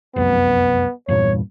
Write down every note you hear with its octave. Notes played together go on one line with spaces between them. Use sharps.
F1 C2 F#2 B3
E2 G2 A#2 C#5